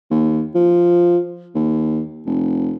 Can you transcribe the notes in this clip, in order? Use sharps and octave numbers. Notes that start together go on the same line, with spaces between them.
D#2
F3
D#2
F1